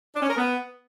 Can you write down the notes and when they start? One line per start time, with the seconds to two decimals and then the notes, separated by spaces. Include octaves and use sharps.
0.15 D4
0.22 C#4
0.30 A#4
0.37 B3